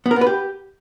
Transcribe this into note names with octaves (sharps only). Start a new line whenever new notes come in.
B3
A#4
B3
B4
G4